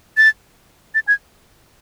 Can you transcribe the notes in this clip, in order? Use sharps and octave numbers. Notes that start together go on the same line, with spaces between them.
A6
A6
G#6